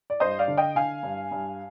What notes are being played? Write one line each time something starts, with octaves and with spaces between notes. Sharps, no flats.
D5
G2 C5 D#5
D5 F5
D3
D#5 G5
D3 F5 G#5
G2
G2